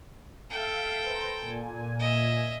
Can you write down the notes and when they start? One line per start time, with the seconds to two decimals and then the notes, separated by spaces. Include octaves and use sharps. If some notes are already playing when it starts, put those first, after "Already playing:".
0.50 A4 E5 F5 G5
1.02 B4 C5 A#5
1.39 A#2 G#5
1.99 D#5 E5